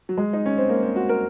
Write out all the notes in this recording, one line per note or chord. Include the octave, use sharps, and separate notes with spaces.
F#3
G#3
D#4
C#4
C4
A#3
C4
F#4
A#4